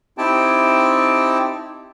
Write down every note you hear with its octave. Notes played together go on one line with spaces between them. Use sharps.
C4 D#4 E4 G4 G5 A5